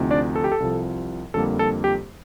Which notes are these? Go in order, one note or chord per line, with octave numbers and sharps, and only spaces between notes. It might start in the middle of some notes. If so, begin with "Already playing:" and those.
Already playing: D2 C3 F3 C4 D#4
D4 D5
A4
G4
A4
C2 C3 F3
F2 D3 G3 A#3 A4
A4
G4